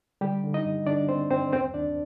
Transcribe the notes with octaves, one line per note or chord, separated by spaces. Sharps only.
D3 G3 G4
D3
D#4 D#5
G2
D3 D4 D5
D3 C4 C5
G2 C4 C5
D#2 C4 C5
D#2 D4 D5